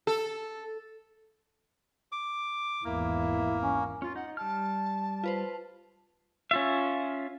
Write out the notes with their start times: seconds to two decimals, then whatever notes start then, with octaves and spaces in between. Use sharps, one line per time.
0.07 A4
2.12 D6
2.85 G#1 E2 A#3 E4
3.62 C#4
4.02 C#4 F4
4.16 D#4 F#5
4.37 G3 A5 F6
5.24 F4 B4 C5
6.51 C#4 F4 E5